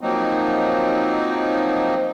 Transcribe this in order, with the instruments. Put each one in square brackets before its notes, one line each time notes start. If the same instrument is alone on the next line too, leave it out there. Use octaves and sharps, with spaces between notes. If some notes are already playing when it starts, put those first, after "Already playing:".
[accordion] F3 F#3 A#3 C4 D#4